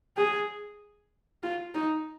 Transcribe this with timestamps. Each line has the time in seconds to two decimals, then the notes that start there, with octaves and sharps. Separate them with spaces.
0.17 G#4
1.43 F4
1.74 D#4